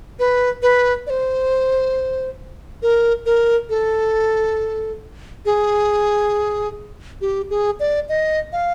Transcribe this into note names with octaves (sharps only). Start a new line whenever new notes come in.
B4
B4
D5
C5
A#4
A#4
A4
G#4
G4
G#4
D5
D#5
F5